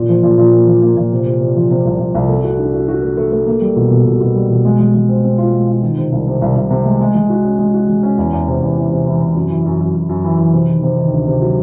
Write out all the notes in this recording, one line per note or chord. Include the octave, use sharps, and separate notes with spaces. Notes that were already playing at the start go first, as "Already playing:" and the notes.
Already playing: A#2
F3
A#2
A#2
A#3
F3
A#3
A#2
C3
C3
C3
F3
C3
C2
C2
C2
A3
F#4
D4
F#4
F#4
A3
A3
A3
A#3
G3
B2
B2
B2
B2
G3
B2
G#3
G#3
G#3
C4
C4
F4
G#3
F4
D#3
C3
C2
C3
C2
C2
C3
G#3
G#3
G#3
F#4
C#4
G#3
F#4
G#3
C#4
E2
E2
C3
E2
E3
C3
E3
C3
F#2
E3
F#2
F#2
F#2
F#2
E3
E3
C3
D#3
C3
D#3
D2
C3
F#3